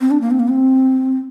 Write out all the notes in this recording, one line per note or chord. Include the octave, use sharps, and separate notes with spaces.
C4
D4
A#3
C4
A#3
C4